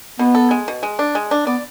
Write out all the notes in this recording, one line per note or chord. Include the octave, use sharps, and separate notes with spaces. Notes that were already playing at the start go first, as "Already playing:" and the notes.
B2 B3
A4
G#3
B2
G#3
D4
G#3
D4
B3 D5